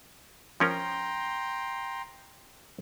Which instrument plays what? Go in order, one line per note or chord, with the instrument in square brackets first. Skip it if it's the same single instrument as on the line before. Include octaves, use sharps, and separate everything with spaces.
[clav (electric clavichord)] F3 C#4 A#4 [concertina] G5 A#5 C6